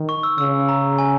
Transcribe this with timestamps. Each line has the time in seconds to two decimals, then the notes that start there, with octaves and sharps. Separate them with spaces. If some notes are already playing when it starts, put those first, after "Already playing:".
Already playing: D#3
0.09 C#6
0.23 E6
0.38 C#3 E6
0.69 A#5
0.98 G#5